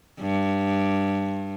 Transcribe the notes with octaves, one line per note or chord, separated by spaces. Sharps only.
G2